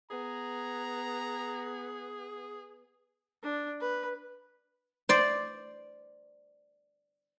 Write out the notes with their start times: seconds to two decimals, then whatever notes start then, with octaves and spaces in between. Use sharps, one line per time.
0.10 B3 G#4 A#5
3.43 D4
3.80 B4
5.09 C5 D5